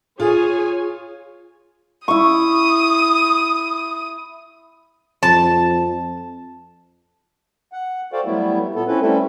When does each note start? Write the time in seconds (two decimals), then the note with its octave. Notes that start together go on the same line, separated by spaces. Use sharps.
0.20 F4 G#4 C#5 G#5
2.08 E4 C#6 D#6
5.23 F2 A5
7.72 F#5
8.13 F#4 A4 C5 D5 F5 G5
8.26 F#3 G3 A3 B3 E4
8.75 A#2 B3 A4
8.87 C4 C#4 E4 A4 B4
9.01 G3 A3 C4 C#4 E4 A4